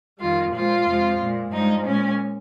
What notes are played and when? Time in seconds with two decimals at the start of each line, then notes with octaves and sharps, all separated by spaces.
0.19 F2 D#3 G3 F4
0.52 A#2 F3 G#3 F4
0.84 F2 C3 F3 G#3
1.18 A#2 G#3
1.51 G2 F3 G#3 D#4
1.84 A#2 G#3 C#4